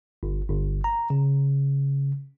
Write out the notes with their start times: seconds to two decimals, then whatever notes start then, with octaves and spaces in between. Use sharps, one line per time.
0.23 G1
0.49 G1
0.84 A#5
1.10 C#3